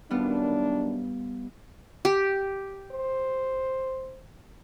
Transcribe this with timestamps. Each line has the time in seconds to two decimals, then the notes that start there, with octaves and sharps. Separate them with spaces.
0.10 F#2 D#3 G3 B3 D4 F4
2.05 G4
2.92 C5